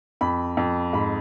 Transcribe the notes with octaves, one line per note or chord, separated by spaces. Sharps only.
F2 B5
F2
G#2 B5